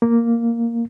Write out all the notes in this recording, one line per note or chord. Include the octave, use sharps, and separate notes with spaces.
A#3